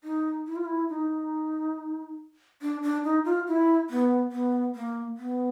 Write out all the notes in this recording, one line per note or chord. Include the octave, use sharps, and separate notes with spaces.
D#4
E4
F4
E4
D#4
D4
D4
D#4
F4
E4
B3
B3
A#3
B3